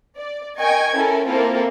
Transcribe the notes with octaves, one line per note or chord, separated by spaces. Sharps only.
D5
A#4 D#5 G5 G#5 C#6 G#6
C#4 E4 A4 A#4 G#5
A#3 C4 E4 F4 A4 A#4